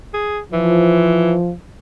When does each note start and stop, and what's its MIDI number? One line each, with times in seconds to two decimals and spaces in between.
0.14 0.40 68
0.53 1.36 52
0.53 1.50 53